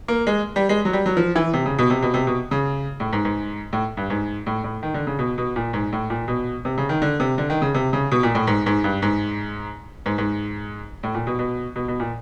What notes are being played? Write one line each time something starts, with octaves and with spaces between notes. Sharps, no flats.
A#3
G#3
G3
G#3
F#3
G3
F#3
F3
E3
C3
C#3
B2
C3
B2
C3
B2
C#3
A2
G#2
G#2
A2
G2
G#2
A2
A2
D#3
D3
C#3
B2
B2
A#2
G#2
A2
A#2
B2
C3
C#3
D#3
D3
C3
D3
D#3
C#3
C3
C#3
B2
A#2
A2
G#2
G#2
G2
G#2
G#2
G#2
A2
A#2
B2
B2
B2
B2
A#2